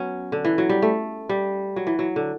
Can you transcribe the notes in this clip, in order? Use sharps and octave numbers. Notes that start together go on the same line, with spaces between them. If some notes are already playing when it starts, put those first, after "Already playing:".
Already playing: F#3 B3 C#4
D3
E3
F#3
G3
A3
G3
F#3
E3
F#3
D3